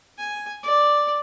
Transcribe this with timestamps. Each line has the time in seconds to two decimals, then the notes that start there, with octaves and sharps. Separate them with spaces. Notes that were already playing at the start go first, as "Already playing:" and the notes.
0.18 G#5
0.63 D5